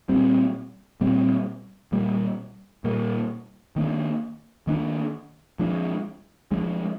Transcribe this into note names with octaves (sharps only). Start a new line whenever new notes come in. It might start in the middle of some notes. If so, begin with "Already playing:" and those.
A#2 G3 C4
A#2 G3 C4
A#2 G3 A#3
A#2 G3 A#3
D#3 A#3 D4
D#3 A#3 D4
F3 G#3 D4
F3 G#3 D4